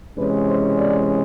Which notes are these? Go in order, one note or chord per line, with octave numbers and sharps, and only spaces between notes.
C3 E3 G#3 C#4 B4
C5
D5